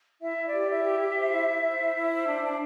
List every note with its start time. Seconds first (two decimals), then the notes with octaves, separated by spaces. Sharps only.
0.21 E4 E5
0.37 E4
0.45 D5
0.53 G4
0.69 E4 E5
0.85 G4
1.01 G4
1.17 C5
1.32 E4
1.48 E4
1.63 C5
1.80 E4
1.95 E4
2.11 C5
2.28 D4
2.42 D4